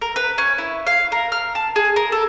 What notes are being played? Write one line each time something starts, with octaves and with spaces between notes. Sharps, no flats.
A#4
B4
C#4
E4
F5
A#4
F6
A5
G#4
A#4
A4